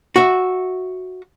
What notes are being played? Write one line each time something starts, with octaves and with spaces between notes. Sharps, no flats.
F#4 E5